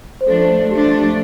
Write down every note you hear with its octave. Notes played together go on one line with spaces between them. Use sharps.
C5
F3 A3 D4 A4
F3 A3 D4 G4